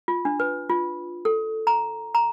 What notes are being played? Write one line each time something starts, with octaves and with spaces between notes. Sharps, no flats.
F4
D4
B4
F4
A4
A#5
A#5